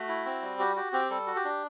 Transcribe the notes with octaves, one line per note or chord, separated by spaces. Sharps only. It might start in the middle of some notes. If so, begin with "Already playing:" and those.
Already playing: A3 F#4
E4
C4
G3
F#4 G4
F#4 G4
C4 G4
G3 A4
F#4
G4
D4